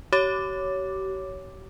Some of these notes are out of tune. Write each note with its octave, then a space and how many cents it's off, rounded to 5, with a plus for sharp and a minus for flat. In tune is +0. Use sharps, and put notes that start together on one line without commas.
G4 -40 C#5 +10 D6 +0